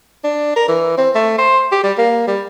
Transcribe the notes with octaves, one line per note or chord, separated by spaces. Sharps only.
D4
A#4
E3
C4
A3
C5
G4
G3
A#3
G3